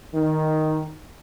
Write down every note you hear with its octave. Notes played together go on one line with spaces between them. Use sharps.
D#3